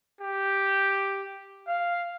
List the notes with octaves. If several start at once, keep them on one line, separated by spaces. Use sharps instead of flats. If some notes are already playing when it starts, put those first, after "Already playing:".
G4
F5